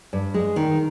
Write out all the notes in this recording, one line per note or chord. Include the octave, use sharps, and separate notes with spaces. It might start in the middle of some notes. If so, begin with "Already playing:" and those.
G2
G#3
D#3